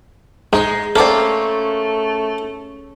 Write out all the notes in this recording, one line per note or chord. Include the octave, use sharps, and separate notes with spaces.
G#2 G#3 D#4
A3 A#3 C4 C#4 A4 D5